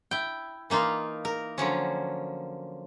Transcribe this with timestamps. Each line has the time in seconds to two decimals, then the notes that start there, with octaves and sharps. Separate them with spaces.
0.11 E4 G5
0.70 E3 A#3 D#4 F4
1.25 A#4
1.58 D3 F3 F#3 C#4